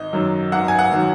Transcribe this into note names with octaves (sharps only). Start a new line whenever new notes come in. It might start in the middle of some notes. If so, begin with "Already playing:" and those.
Already playing: G#1 D#5
F#2 D#3 F#3
G#1 F#5
G#5
F#5
D#3 F#3